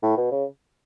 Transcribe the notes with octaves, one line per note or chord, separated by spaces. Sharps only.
A2
B2
C#3